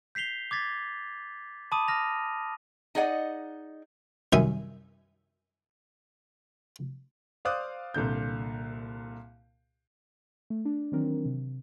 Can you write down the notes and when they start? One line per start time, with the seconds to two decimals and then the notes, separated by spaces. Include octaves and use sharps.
0.15 G6 B6 C7 F7 G7
0.51 D6 G#6 A6 B6
1.72 A5 B5 D6 D#6 D#7
1.88 F6 A#6 F7
2.95 D#4 G#4 D5 D#5 F#5
4.33 C2 F#2 D#3 E5 G#5 D#6
7.45 C5 D5 F5 D6 D#6 F#6
7.94 C2 A#2 D3 G6
10.50 A3
10.65 D4
10.92 D#3 E3 F#3 C4 D4 A#4
11.25 C3